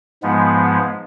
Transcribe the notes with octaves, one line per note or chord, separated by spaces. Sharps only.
G#2 F3 G#3 B3